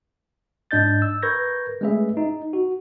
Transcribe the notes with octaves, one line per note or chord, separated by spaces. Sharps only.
G#2 D4 D#5 G6 A6
E6
A#4 B4 C#6 G6 G#6 A#6
G#3 A3 C#4 G#4 B4 E5
D#4
F#4